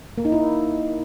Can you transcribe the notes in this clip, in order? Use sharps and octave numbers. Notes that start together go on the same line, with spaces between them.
A#3
D#4
E4